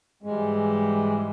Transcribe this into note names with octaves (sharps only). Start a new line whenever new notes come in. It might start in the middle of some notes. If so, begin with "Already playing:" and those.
G#2 E3 G3 G#3